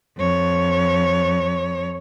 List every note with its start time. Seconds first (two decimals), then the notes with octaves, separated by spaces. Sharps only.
0.18 F2 C#5